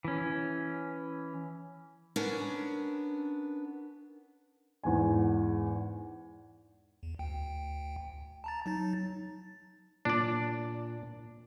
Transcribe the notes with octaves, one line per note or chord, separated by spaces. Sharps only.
E3 C#4
B3 C#4 D4 A#4
E2 G#2 G#5
E2
D2 G5
A5 A#5 A6
F#3 D#4 A6
A#2 D4 D5